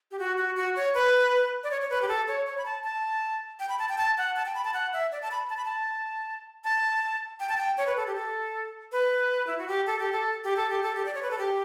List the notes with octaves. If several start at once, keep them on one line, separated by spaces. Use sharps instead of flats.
G4
F#4
F#4
F#4
C#5
B4
D5
C#5
C#5
B4
G4
A4
C#5
C#5
B5
A5
A5
G5
B5
A5
G5
A5
F#5
A5
G5
B5
A5
F#5
E5
D5
A5
B5
A5
B5
A5
A5
G5
A5
G5
C#5
B4
A4
G4
A4
B4
E4
F#4
G4
A4
G4
A4
G4
A4
G4
A4
G4
D5
C#5
B4
A4
G4